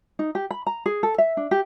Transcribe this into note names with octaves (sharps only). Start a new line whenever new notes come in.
D#4
G4
B5
A#5
G#4
A4
E5
D4
G4